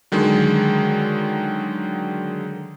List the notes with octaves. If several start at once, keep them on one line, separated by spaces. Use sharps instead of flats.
D3 D#3 F#3 G#3